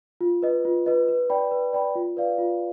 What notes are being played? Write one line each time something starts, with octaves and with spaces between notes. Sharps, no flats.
F4
B4 D#5
F4
B4 D#5
B4
D5 G5 B5
B4
D5 G5 B5
F4
B4 D5 F5
F4